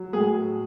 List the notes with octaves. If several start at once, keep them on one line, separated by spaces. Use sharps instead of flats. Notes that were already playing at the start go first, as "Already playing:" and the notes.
Already playing: F#3
A2 G#4